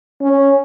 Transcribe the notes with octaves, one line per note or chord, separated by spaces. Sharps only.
C#4